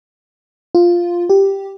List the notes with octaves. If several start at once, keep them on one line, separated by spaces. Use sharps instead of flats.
F4
G4